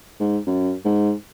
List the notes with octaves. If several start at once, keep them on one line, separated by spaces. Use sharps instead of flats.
G#2
F#2
G#2